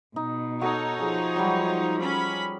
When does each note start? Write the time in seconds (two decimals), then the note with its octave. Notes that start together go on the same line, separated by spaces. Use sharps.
0.16 B2 D#4
0.61 D#4 F#4 A4 C#5
0.99 F3 G#4
1.36 F#3 G3
2.00 C#4 B5